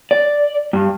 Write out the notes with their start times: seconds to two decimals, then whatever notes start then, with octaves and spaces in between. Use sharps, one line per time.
0.11 D5
0.73 G2